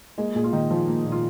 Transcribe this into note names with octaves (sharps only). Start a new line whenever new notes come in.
G#3 A#3 G#4
A#2 G#4
F4
A#2 D#3 D#4
F3 F4
A#3
A#2
F4